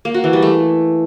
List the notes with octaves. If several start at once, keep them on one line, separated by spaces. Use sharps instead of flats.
A#3
F#4
E3
G3
A3